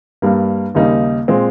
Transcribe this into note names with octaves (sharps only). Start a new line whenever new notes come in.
G2 G3 A#3
D#2 C#3 G3 A#3 D#4
A#2 G#3 C4